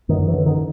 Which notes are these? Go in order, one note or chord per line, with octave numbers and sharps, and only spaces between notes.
F#2 D#3
E3
D3
D#3